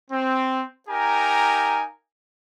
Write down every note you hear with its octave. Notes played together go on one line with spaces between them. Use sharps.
C4
D#4 G4 A#4 F5 G#5 A#5